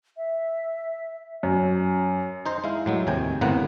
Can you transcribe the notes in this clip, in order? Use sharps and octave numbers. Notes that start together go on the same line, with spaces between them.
E5
F#2
D#4 C5 A#5
G#3 E4 F5
A2 F#3 G#3
D#2 C3 G5 G#5
G1 A2 C3 A#3 B3 F#5